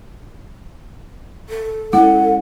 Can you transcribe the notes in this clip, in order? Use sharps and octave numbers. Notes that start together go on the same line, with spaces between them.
A4
G#3 C#4 E4 F#5